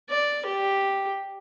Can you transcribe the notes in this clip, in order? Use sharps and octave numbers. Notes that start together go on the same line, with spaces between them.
D5
G4